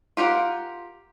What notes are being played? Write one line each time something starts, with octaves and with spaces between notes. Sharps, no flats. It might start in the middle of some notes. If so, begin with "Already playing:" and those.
F4 G4 A#4 F#5